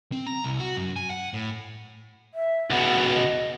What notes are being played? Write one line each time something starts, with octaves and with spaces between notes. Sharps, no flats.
C4
A#5
C2
F#4
F#2
G#5
F#5
A2
E5
C#2 B2 F#5
D#5